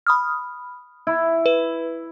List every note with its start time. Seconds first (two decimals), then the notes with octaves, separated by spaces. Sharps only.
0.07 B5 D#6 F6
1.07 E4
1.46 B4